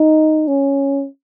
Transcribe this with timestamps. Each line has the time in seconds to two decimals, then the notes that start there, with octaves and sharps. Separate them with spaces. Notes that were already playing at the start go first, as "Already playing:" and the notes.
Already playing: D#4
0.48 C#4